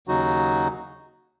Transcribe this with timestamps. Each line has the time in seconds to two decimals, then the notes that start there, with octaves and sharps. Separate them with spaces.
0.07 D#2 C#3 F#3 D#4 F#4